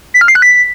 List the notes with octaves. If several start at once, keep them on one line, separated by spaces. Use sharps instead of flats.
B6
F6
C7
F#6
B6